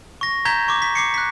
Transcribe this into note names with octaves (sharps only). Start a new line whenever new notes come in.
C#6 A#6
A#5 G6 G#6 B6 E7 G7
C#6 D6
B6
D6 C7 C#7
F#6 B6